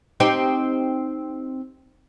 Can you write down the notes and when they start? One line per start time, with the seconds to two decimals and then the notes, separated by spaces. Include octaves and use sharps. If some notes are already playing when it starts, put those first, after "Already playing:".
0.20 C4 D#4 G4